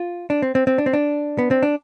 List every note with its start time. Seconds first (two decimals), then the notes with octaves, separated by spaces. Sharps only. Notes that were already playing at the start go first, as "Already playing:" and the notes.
Already playing: F4
0.30 D4
0.42 C4
0.55 C4
0.67 C4
0.78 D4
0.86 C4
0.93 D4
1.39 B3
1.51 C4
1.63 D4